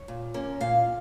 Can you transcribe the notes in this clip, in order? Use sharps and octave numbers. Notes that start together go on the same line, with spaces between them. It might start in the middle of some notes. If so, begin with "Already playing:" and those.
Already playing: C#5
A#2
A#3 C#4
A#2 F5